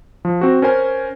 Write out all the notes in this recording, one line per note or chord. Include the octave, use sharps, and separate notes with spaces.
F3
C4 F#4
C#4 A#4 C5 G#5